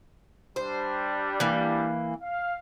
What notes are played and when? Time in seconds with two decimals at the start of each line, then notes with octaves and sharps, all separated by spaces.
0.56 G3 D4 C5
1.40 E3 A#3
2.21 F5